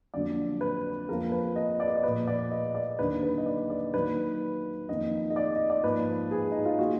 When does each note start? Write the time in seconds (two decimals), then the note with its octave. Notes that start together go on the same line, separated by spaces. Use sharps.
0.14 F2 D3 F#3 A#3 D5
0.61 B4
1.09 F2 F3 A#3 A#4
1.32 B4
1.56 D#5
1.80 D5
1.88 D#5
1.96 D5
2.03 A#2 F3 A#3 B4
2.27 D5
2.51 D#5
2.75 D5
2.99 D#2 D3 F#3 A#3 B4
3.23 B4
3.38 D#5
3.46 D5
3.70 D5
3.94 D#2 D#3 F#3 A#3 B4
4.89 F2 D#3 A#3 D#5
5.30 D#5
5.36 D5
5.56 D#5
5.70 D5
5.84 G#2 F3 A#3 B4
6.31 G#4
6.51 D#4
6.65 F4
6.79 D#3 A#3 F#4